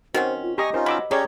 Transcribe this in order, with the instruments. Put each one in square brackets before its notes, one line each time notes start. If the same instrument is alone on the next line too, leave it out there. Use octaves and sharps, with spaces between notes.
[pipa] D#3 C4 C#4 [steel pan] F#4 [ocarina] C5
[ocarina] F4
[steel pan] G4 A#5 D#6 [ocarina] D#5 [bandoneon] G#5 C#6
[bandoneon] C#4 D#4 F4 [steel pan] A#4 C5
[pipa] F#3 [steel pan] B5 D6 E6
[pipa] C#4 [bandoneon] G4 A#5 [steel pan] G#4 C#5 D5